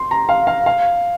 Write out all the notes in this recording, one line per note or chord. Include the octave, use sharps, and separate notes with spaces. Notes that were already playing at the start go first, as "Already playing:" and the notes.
Already playing: C6
A#5
F5
F5
F5